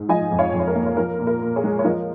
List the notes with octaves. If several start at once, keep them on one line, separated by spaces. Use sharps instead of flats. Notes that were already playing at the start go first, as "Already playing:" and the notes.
Already playing: G#2
F3 D#5 G#5
F2
C#5 F5
F2
C#5
A#4
A#3
C#5
F3 A#4
A#2
A#4
A#2
G#4 C#5
G#3
C#5
F3 A#4 D#5